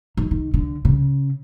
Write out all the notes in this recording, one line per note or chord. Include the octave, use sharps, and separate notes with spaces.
D#3
D#3
D3
C#3